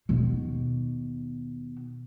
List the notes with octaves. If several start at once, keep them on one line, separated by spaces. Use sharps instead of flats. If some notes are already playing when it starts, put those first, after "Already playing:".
D#2 B2